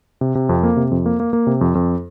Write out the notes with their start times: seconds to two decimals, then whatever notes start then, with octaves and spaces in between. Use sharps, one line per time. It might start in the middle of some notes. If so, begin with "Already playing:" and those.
0.21 C3
0.35 C3
0.49 F2
0.63 A#3
0.77 C3
0.91 F2
1.06 A#3
1.20 A#3
1.33 A#3
1.47 C3
1.61 F2
1.75 F2